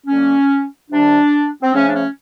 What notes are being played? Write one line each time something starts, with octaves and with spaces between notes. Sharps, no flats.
D3 F#3 A#3 C#4
C3 D#3 G3 D4
C4
C#3 F3 A3 C#4
D4
C#4